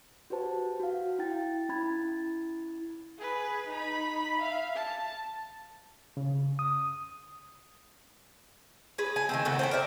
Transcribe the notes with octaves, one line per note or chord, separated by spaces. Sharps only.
F#4 G4 B4 C5 A5
F#4 F5
E4 G5 A6
C#4 E4 B5 G#6 A6
G#4 B4
D#4 B5
E5 F5
A5
C#3
D#6
G#4 B4
G#5
D#3 A3 C4
A2 C#3 B3 A4
G4 A#4 C5
A#4 D5 E5